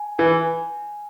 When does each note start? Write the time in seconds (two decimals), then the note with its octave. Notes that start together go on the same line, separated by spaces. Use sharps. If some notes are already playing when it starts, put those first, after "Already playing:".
Already playing: G#5
0.18 E3 G#5